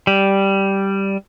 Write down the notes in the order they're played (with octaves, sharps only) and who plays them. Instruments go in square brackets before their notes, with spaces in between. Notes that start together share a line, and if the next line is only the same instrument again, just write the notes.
[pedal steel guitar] G3